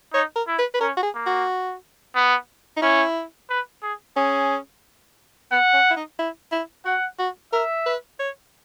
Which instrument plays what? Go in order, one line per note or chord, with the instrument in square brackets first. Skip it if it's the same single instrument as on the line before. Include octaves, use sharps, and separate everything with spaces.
[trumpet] D#4 [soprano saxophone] C#5
[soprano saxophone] A#4
[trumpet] E4
[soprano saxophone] B4
B4
[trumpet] C#4 [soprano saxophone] A#4
[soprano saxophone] F#4
G#4
[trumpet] A#3
[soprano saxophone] F#4
[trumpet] B3
[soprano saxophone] D#4
[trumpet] C#4 [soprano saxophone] E4
[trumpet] B4
G#4
[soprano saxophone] C#4 [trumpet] G#4
[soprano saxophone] B3 [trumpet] F#5
[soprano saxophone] C#4
E4
D#4
E4
E4
[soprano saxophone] F#4 [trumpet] F#5
[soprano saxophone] F#4
[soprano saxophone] A#4 [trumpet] E5
[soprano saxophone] B4
C#5